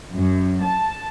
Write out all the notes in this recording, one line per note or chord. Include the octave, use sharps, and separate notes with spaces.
F#2
A5